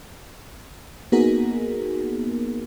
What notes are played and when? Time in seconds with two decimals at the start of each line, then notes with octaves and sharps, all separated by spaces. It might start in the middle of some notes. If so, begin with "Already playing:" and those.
1.12 A#3 B3 D#4 F#4 G#4 A#4